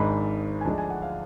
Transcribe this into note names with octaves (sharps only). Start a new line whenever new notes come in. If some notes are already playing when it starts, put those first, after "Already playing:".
Already playing: G#1 G#2 G#3 D4 B5
G#5
D2 D3 F3 G#3 D4 A5
G#5
F#5
F5